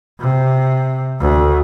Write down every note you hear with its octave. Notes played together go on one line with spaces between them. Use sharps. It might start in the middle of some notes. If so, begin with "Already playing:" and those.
C3
D2